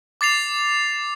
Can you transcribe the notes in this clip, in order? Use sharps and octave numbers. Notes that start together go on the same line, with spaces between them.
D6 A6 C7 F7